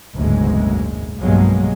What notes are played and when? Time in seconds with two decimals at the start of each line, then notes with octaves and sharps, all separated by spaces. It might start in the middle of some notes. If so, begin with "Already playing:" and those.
0.15 F#1 D2 G#2 B2 G#3
1.21 B1 G2 B2 F#3 G#3 A#3